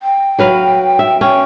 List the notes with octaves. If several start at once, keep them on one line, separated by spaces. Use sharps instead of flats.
G5
F#3 B4 F5
E5
C#4 G5